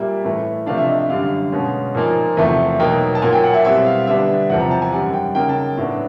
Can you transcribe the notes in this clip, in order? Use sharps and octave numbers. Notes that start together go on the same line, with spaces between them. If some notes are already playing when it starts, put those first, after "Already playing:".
Already playing: A#2 G3 A#3 E5
A2 E3 A3
C3 F3 A3 D4 F5
E5
D#5
E5
F#2 D3 G3 F5
B2 G#3 C#4
A#2 F3 A#3 D#4
E2 C3 F3 A3
B2 F#3 A#3 D#4 G5
A5
A#2 F#3 A#3 G#5
G5
F#5
E5
B2 G3 C4 E4 E5
F5
D3 G3 B3 D4 E5
E2 C3 F3 F#5
A#5
A5
G#5
F#2 D#3 G3 F#5
G5
C#3 F#3 A#3 D#4 G5
A5
A2 F#3 B3 D4